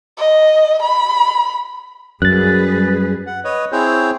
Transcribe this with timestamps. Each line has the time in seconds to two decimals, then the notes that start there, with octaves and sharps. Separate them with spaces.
0.17 D#5
0.82 B5
2.22 F#2 G3 G#4 B4 F#6 A6
3.27 F#5
3.44 B4 C#5 D#5
3.72 C4 E4 G#4 C5 C#5